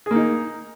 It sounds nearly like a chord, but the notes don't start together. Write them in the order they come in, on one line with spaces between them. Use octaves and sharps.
G#4 A#3 D#4